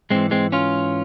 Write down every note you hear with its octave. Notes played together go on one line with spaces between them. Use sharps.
G#2 E3 G#3 C4
G#3 C4
C#4 F4